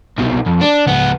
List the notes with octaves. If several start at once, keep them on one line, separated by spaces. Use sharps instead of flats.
C2 B2
F2
D4
C#2 B3